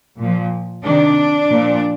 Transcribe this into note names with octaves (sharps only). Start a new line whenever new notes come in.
A#2 F3
C3 D#3 D4
A#2 F3